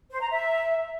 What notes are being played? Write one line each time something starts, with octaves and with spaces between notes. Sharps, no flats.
C5
A#5
E5